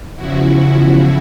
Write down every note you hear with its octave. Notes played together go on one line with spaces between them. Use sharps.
E2 C#3 F3 E4 F#4